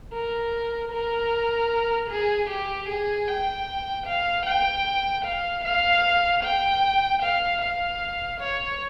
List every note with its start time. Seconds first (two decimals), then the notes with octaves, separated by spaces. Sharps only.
0.13 A#4
0.92 A#4
2.10 G#4
2.49 G4
2.89 G#4
3.28 G5
4.06 F5
4.46 G5
5.25 F5
5.64 F5
6.44 G5
7.22 F5
7.61 F5
8.41 C#5